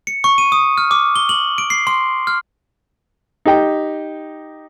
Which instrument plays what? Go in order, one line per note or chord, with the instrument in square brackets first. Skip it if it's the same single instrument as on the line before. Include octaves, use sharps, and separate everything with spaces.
[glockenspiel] C#7
C#6
D#7
D#6
F6
D6
G7
F#7
D7
C7
C6
F6
[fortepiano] D#4 G4 G5